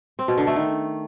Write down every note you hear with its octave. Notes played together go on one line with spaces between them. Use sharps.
C4
B2
D3
A3
D#3